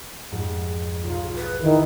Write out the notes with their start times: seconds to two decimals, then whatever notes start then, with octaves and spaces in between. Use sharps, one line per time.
0.32 F2 G#2
1.04 B1 F4 G#4
1.36 B4 F5
1.62 D#3 E4